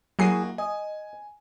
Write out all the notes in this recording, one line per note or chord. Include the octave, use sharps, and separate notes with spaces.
F#3 A#3 E4 F#4 G#4 C7
D#5 G#5